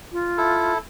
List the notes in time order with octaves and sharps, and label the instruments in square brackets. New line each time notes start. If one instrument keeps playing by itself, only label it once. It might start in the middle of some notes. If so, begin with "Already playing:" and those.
[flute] F4
[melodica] E4 A4